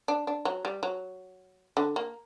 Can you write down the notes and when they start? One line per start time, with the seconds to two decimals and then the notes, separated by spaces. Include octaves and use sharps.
0.08 D4
0.27 D4
0.45 F#3
0.65 G3
0.83 F#3
1.77 D3
1.96 A#3